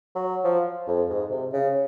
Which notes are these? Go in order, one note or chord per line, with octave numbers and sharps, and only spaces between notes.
F#3
F3
F2
G#2
C3
C#3